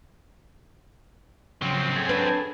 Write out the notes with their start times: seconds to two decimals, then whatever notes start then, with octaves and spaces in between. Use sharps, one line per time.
1.62 C#3 F3 F#3 C4
1.96 G#4 A4 G#5
2.09 D4 B4